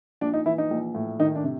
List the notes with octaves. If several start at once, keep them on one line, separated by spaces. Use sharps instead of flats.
A#1 D4
D#4
E3 E4
D#4
A#1
A2
D#3 D#4
D4
C3